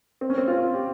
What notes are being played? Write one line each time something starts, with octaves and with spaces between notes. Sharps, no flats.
C4
C#4
C4
F4
G4